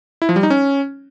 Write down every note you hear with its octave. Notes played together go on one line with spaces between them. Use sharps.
E4
F3
G3
D#4
C#4